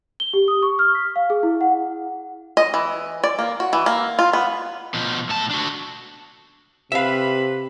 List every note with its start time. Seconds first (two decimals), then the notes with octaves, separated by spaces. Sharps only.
0.20 G7
0.33 G4
0.48 D#6
0.63 C#6
0.79 F6
0.95 B6
1.16 F5
1.30 G#4
1.43 E4
1.61 F#5
2.57 D#5
2.74 E3
3.24 D5
3.39 A#3
3.60 F#4
3.73 E3
3.86 A#3
4.19 F4
4.33 B3
4.94 B2 F3
5.29 A2 A5
5.51 D4 F#4
6.92 C3 B4 E5 F5 B5